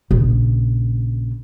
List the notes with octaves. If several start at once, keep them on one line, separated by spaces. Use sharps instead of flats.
A#1 C#3